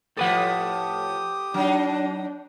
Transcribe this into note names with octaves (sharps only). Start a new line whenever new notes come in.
A2 F3 G4 A4 B4 F#5 D#6
F#3 D4 D#4